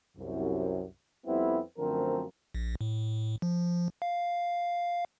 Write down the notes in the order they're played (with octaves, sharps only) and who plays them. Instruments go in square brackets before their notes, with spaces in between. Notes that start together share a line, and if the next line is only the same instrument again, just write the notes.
[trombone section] C2 F#2
F2 G3 B3 C4 E4
F#2 D3 F3 A3 C4 A#4
[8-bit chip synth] A#1
A2
F3
F5